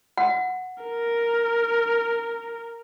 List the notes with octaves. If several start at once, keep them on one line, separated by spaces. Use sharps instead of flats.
F#5
A#4